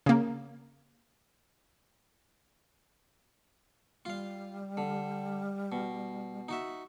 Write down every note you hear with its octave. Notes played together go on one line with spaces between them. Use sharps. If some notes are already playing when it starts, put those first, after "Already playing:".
C#3 A#3
G3 F4 F5
D3
B2
D#4 F#4 E5